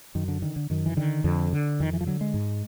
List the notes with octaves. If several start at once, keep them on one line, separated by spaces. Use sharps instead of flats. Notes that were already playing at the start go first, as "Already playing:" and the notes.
F#2 D#3
D3
D3 D#3
D3
F#2 D#3
E3
D3 D#3
F2 D3
D3
F2 D#3
E3
F3
D3 F#3
G#3
G#2